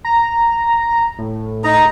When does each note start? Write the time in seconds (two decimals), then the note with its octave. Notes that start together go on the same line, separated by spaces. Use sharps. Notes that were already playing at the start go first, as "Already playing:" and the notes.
0.04 A#5
1.18 A2
1.64 D#4 A#5